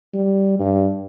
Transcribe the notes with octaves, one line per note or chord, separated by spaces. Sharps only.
G3
G2